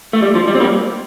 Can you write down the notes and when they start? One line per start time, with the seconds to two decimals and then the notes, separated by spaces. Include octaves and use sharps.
0.13 A3
0.22 G3
0.35 F3
0.48 G3
0.55 C4
0.60 G3 A#3